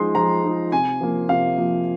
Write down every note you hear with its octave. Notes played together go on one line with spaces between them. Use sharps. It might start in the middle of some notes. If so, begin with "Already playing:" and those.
Already playing: F3 G#3 D#4 C6
F3 A#5
G#3 D#4
C3 G#5
F3 A#3
C3 F5
F3 A#3